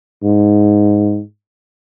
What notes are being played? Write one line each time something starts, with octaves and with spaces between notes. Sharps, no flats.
G#2